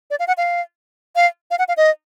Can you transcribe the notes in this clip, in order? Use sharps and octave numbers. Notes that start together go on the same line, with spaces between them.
D5
F5
F#5
F5
F5
F5
F#5
F5
D#5